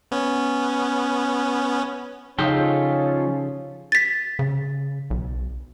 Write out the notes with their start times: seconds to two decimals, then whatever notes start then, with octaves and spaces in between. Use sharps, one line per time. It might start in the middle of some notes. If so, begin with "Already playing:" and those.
0.11 B3 C#4
2.39 C#3 F3 C#4 D#4 F4 G4 A4 G5
3.92 A6 B6
4.39 C#3
5.10 B1